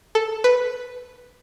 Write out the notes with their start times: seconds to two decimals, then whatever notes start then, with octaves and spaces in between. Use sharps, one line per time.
0.15 A4
0.44 B4